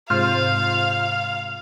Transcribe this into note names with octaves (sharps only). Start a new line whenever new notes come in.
G#2 C3 F4 C5 F5 F6